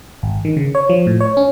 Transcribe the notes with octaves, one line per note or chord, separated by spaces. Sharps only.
G#1
D#3
C#3
C#5
F3
A2
C#5
C#4